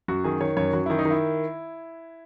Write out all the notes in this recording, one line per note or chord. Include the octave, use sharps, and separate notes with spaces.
F#2 F#4
D#3 G#4
D#3 C#5
F#2 C#5
F#2 F#4
D#3 E4
D#4
D#3
E4